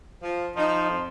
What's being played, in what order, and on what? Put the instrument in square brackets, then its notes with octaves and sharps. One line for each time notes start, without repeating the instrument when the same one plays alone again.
[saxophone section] F3
[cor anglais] F3 [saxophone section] D#4
[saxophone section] F2